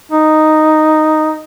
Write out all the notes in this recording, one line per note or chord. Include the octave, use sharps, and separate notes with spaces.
D#4